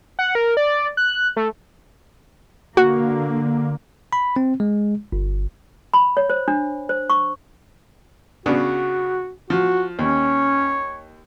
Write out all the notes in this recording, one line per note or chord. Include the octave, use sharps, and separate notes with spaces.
F#5
A#4
D5
F#6
A3
D3 A#3 F#4
B5
C4
G#3
G1
B5
C#5
C5
D4
C5
C#6
C#3 B3 D4 F#4
F3 F#4
D#2 C#4 C#5